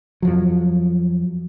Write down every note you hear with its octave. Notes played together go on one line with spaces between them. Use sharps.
F2 F3 F#3